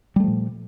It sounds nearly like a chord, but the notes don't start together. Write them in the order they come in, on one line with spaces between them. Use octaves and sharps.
G3 A3 F3 A#2